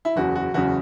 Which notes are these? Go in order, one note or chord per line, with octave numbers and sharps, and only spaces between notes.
E4
F#1 E2 C#3 F#4
F#4
F#1 E2 C#3 F#4